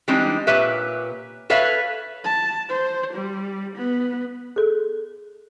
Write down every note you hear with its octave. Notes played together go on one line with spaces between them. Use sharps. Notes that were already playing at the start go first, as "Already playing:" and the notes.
E3 G3 G#3 C4 D4 D#4
A#2 G4 B4 C#5 E5
A4 B4 C#5 E5 F5
A5
C5
G3
B3
G#4 A4